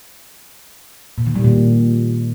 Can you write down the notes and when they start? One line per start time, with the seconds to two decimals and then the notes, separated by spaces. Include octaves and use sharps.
1.18 A#2
1.27 D#3
1.35 G3
1.44 A#2